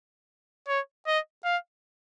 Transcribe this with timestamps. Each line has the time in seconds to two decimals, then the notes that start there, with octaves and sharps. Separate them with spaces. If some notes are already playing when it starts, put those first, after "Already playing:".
0.68 C#5
1.07 D#5
1.45 F5